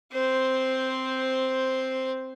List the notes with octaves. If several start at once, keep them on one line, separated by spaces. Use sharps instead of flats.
C4 C5